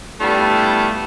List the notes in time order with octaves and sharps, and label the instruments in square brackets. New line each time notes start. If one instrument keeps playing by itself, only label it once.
[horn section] G3 A3 B3 D4 E4 F4